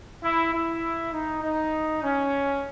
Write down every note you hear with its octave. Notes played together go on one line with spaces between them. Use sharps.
E4
E4
D#4
D#4
C#4